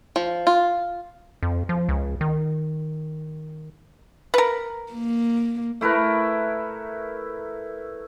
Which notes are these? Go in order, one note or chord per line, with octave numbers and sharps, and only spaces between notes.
F3
F4
F2
F3
C#2
D#3
A#4 B4
A#3
A3 E4 A#4 B4